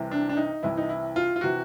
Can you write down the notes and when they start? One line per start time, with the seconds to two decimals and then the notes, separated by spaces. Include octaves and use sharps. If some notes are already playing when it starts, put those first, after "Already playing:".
Already playing: C2 C3 E3
0.11 D4
0.29 D4
0.37 D#4
0.63 C2 C3 E3 E4
0.77 D#4
0.89 E4
1.16 F4
1.36 F4
1.41 C3 E3 F#4